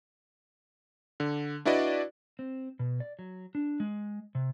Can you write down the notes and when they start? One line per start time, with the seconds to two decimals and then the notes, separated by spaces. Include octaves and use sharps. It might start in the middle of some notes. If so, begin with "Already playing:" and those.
1.20 D3
1.65 D4 E4 F#4 B4 D5 D#5
2.39 C4
2.79 B2
3.00 D5
3.19 F#3
3.55 D4
3.80 G#3
4.35 C3